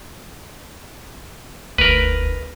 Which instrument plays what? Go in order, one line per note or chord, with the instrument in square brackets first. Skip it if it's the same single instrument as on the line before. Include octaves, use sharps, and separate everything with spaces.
[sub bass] F1 [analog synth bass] D2 [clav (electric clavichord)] A#4 B4